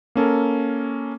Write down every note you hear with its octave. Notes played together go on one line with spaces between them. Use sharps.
A#3 C#4 A4 A#4